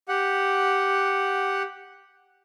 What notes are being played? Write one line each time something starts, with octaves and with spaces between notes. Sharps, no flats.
G4 F#5